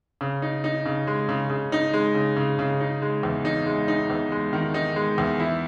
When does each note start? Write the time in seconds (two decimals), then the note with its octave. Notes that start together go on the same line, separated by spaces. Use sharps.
0.21 C#3
0.42 D#4
0.64 D#4
0.86 C#3
1.07 G#3
1.29 C#3
1.50 C#3
1.72 D#4
1.93 G#3
2.15 C#3
2.37 C#3
2.59 C#3
2.80 D#4
3.02 G#3
3.23 E2
3.45 D#4
3.66 G#3
3.88 D#4
4.10 E2
4.32 G#3
4.53 D#3
4.74 D#4
4.96 G#3
5.18 E2
5.40 E4